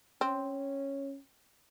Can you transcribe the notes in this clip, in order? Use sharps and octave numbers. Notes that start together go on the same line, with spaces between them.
C4 C#4